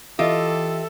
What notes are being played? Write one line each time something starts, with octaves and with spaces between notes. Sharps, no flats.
E3 F4 G4 A4 D#5 E5 E6